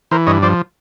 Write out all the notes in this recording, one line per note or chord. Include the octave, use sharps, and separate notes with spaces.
E3 A#4 C5
G2 C#5 D#5
F3 C5 D5